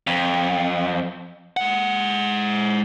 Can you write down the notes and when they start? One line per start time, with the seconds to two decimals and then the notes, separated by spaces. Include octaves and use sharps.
0.07 F2
1.57 G#3 F#5